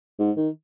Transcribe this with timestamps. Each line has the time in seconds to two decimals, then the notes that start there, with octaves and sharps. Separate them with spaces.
0.19 G#2
0.37 D#3